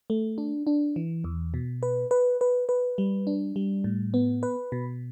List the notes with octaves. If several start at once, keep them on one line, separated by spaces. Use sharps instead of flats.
A3
D4
D4
E3
E2
B2
B4
B4
B4
B4
G3
D4
G3
A2
B3
B4
B2